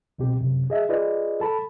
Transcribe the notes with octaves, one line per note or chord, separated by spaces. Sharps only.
C2 B2 C4 G4
F#2 C3
G#4 D#5 E5
F4 G#4 B4 D5 D#5
A4 A5 B5